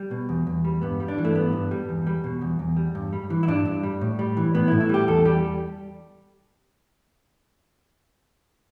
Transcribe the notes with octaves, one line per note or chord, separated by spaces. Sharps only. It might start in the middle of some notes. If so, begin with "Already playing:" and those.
Already playing: G3
B2
E2
E2
G3
G2 B3
G3
D4
E3
A3
G2 B3
G2
G3
E2
G3
B2
E2
E2
G3
G2
G3
E3
E4
G2 D4
G2
G3
A2
G3
E3
A2 B3
A2 E4
E4
G3 G4
E2 A4
G3 G4